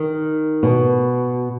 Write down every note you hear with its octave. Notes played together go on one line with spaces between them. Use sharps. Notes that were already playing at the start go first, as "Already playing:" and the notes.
Already playing: D#3
B2